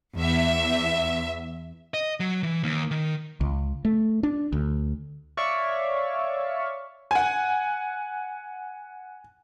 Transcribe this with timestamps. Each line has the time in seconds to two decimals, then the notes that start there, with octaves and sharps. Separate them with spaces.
0.18 E2 E5
1.94 D#5
2.20 F#3
2.43 E3
2.63 D#2
2.91 D#3
3.41 C#2
3.85 A3
4.23 D4
4.52 D2
5.37 C#5 D5 E5 F5 C#6
7.11 F#5 G#5